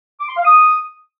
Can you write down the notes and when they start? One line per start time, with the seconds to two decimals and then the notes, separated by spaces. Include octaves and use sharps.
0.21 D6
0.29 C6
0.37 F5
0.45 D#6